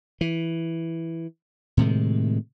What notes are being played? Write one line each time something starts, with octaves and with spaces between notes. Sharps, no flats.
E3
A2 C3 D#3 G#3